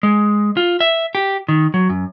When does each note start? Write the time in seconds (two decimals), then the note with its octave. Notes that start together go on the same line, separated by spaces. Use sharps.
0.03 G#3
0.57 F4
0.80 E5
1.15 G4
1.49 D#3
1.74 F#3
1.89 F#2